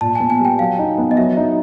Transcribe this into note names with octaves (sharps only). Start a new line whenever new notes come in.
A#2 A5
G#5
B3
G#5
G3 G5
F#3 F5
D#4
B3
D#5
F#3 E5
D#4